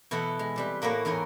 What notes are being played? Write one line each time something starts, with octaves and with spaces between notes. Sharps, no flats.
B2 E3 E4 A4 F#5
G#3
C3 G3 B4
A2 A#3 E4 F#4 C#5
E2 G#2 E4 C#5 G#5